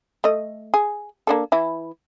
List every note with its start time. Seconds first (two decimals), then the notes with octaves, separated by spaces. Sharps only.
0.24 A3 D#5
0.74 G#4
1.27 A#3 D4 A4
1.52 E3 E4